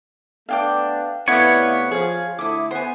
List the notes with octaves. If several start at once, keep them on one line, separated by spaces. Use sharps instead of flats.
A3 B3 D4 F5 G5 D6
C3 A3 B3 E4 C#5 D5 F5
F3 G#4 F5
D3 A3 E4 D6 D#6
B3 C5 G#5